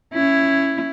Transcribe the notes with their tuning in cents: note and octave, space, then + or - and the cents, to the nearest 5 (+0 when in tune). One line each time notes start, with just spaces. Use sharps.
C#4 +0 E4 +10